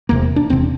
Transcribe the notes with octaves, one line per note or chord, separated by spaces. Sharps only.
E1 E2 C3 A#3
D4
E1 E2 C3 C4